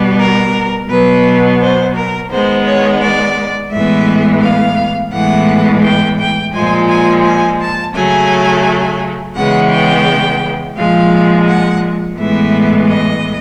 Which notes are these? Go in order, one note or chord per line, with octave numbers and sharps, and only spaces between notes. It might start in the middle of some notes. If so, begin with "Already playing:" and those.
Already playing: B2 G3 B3
A#4
B2 F#3 B3 B4
C5
A#4
D#3 G#3 B3 C5
C#5
D5
A2 E3 G#3 B3 E5
F5
A2 E3 G#3 B3 F#5
G5
G5
A#2 F3 G#3 G#5
G#5
G#5
A5
C#3 F#3 A3 G#5
C#3 E3 G#3 B3 F#5
G5
A#2 F3 G#3 F5
F#5
A2 E3 G#3 B3 E5
D#5